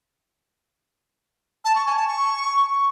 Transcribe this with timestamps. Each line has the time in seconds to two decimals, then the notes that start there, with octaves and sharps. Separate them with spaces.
1.65 A5
1.75 C#6
1.86 G#5
1.97 A5
2.08 C#6